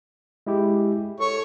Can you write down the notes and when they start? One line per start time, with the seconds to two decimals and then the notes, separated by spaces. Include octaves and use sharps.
0.47 G#3 E4 G4
1.20 A4 C#5